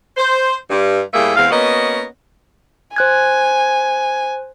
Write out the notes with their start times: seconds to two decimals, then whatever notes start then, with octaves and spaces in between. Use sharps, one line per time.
0.16 C5
0.70 G2
1.13 A2 G3 A3 A#3 G#4 E5
1.36 E2 G#3 C4 F5
1.50 A#3 B3 C#4 F#4 D#5
2.96 C5 G#5 F#6 G#6